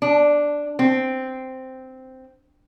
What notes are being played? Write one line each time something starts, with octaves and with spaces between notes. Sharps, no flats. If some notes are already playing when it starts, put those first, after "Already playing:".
D4
C4